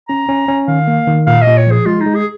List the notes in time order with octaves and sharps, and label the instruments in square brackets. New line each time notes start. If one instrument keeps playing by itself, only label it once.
[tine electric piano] C#4 [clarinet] A#5
[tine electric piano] C#4
C#4
[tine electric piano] D#3 [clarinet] F5
[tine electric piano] A#3
D#3
[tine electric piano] A#2 [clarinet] F5
[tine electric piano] A#2 [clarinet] D#5
[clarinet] C#5
[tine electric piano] F3 [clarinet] G#4
[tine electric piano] G#3 [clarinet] F4
[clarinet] D#4
[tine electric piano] G#3
[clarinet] G#4